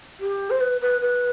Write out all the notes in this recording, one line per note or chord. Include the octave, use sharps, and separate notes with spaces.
G4
C5
B4
B4
B4